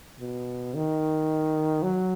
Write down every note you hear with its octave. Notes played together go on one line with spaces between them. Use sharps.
B2
D#3
F#3